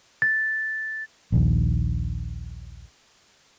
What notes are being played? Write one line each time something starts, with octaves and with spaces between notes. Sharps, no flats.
A6
A#1 D#2